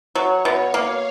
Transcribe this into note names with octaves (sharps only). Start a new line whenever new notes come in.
F#3 C#5
B2
F5
A#3